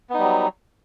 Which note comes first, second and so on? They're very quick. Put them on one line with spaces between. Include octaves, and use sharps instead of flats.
B3 D#4 G3 F#3